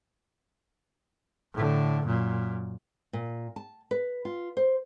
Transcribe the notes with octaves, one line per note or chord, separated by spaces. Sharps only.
A2 D3
F#2 A#2
A#2
A5
B4
F4
C5